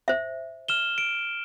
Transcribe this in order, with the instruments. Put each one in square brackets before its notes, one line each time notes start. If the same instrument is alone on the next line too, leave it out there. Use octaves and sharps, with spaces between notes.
[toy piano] C5 E5
[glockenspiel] F6 E7 G7
D7